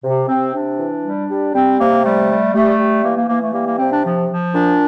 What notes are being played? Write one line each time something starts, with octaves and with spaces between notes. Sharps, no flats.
C3
C3 C4
C3 D4
E3
G3
G3
G3 C4
C3 A#3
G3 A3
G3
G3 A3
G3
E3 A#3
A#3
E3 A#3
A3
G3 A#3
A#3
C3 C4
D4
F3
F3
A#2 D4